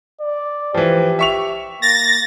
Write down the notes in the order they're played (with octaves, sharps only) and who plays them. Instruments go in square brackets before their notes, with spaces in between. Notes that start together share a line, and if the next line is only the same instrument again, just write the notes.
[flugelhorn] D5
[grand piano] E3 F3 [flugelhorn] G4
[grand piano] E5 C#6 F7
[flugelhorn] A#3 [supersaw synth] A6 A#6